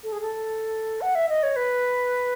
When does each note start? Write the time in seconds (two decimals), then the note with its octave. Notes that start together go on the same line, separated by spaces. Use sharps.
0.03 A4
0.12 G#4
0.21 A4
1.01 F#5
1.15 E5
1.29 D#5
1.43 C#5
1.56 B4